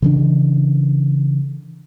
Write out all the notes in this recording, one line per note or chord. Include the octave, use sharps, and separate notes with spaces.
C#3 E3 D4